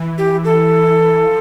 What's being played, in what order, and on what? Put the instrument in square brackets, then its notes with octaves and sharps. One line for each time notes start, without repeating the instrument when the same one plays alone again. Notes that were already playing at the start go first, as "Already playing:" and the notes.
Already playing: [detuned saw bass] E3
[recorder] G4
A4
[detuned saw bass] F3